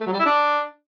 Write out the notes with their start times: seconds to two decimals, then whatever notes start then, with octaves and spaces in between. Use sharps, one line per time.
0.01 A3
0.07 F#3
0.13 G3
0.19 E4
0.25 D4